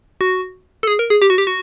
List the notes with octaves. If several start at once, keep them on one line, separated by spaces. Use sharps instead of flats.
F#4
A4
G#4
A#4
G#4
G4
F#4
G4
F#4